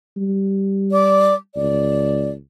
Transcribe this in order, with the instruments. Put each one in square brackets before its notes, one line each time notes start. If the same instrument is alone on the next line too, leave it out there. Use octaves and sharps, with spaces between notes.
[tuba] G3
[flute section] D5 D6
[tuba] C#2 [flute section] D5